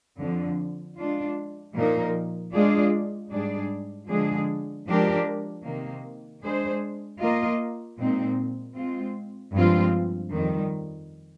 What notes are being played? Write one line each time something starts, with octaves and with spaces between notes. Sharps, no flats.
F2 D3 F3
G#3 D4 F4
A#2 F3 A#3 D#4 A#4
G#3 D4 F4 G#4 D5
G#2 G3 D4 G#4 D5
D3 F3 G#3 D4 G#4
F3 G#3 D4 G4 A#4
C3 D#3 A#3
G#3 D4 G#4 C5
A#3 F4 A#4 D#5
A#2 G#3 C4 D#4
G#3 C4 F4
G2 F3 G#3 C4 F4
F2 D#3 G3